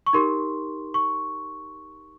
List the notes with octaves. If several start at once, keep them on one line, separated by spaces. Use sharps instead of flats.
C#6
D#4 G4 A#4 C6
C#6